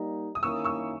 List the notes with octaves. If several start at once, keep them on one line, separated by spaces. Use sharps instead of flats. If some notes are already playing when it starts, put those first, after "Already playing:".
Already playing: G3 A#3 D#4
D#6
D#3 A#3 C#4 E4 C#6 E6
C#6 E6